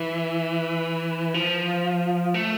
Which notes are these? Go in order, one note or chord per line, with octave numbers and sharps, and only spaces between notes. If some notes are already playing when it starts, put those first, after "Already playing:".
Already playing: E3
F3
A3